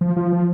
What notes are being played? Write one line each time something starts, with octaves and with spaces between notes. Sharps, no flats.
F3
F3
F3